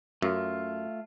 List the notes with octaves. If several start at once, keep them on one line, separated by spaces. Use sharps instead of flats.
F#2 A3 F4